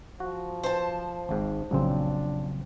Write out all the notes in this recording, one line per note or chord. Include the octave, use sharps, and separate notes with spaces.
F3 F#4
C5 A5
G#1 G#2
A#1 F2 C#3 F#3 C4 D4